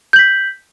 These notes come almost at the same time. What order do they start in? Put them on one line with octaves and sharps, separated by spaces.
G6 F#7 B6